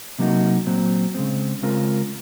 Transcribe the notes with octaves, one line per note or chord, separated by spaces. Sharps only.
C3 F#3 A#3 D#4 F#4
A#2 F#3 C4
C#3 G#3 C4
C#3 G#3 C4 F4 A#4